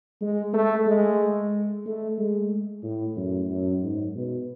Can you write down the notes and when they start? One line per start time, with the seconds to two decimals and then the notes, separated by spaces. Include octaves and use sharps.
0.21 G#3
0.53 A3
0.86 G#3
1.86 A3
2.18 G#3
2.83 A2
3.17 F#2
3.50 F#2
3.82 G#2
4.15 B2